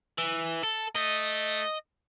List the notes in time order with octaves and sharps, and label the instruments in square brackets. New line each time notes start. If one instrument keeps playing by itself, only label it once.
[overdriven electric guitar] E3
A4
[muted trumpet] A3 [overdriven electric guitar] D#5